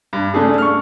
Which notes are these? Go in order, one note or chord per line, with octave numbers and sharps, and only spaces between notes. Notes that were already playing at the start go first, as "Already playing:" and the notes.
G2
C#3 A3 D4 G#4
C#6 F6